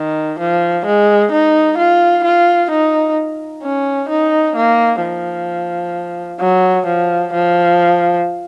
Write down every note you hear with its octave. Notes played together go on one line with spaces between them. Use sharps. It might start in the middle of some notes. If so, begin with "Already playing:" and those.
Already playing: D#3
F3
G#3
D#4
F4
F4
D#4
C#4
D#4
A#3
F3
F#3
F3
F3